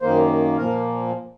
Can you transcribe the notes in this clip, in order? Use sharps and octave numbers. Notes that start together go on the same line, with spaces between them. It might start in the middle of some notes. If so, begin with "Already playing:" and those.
F#2 D#3 A#3 C5
A#2 F3 A#3 A#4